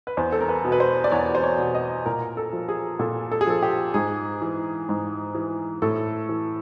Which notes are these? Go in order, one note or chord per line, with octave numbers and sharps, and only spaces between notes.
B4
E2 C5
A4
A#4
B4
B2
B4
C5
D5
E2 C#5
C5
C#5
B2
D#5
A#2 A#4
A4
F3
G#4
A#2 A4
A4
G#4
F3 A4
G4
G#2 G#4
E3
G#2
E3
A2 A4
E3